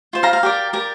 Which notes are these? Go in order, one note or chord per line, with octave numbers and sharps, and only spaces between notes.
F4 C5
F5 A#5
F5
G4 A#4 D5
G4 A#4 D5